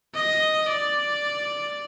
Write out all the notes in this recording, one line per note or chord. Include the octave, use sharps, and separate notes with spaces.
D#5
D5